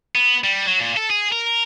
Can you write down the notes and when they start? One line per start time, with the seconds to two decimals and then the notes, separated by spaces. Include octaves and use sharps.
0.15 B3
0.44 G3
0.66 F#3
0.80 A#2
0.97 A4
1.10 G#4
1.32 A#4